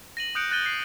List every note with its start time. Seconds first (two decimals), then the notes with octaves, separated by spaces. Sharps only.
0.17 A#6 D#7 F#7
0.35 D#6 F#6 G6 C#7 D7
0.51 F#6 G6 A6 D#7 G7
0.66 C7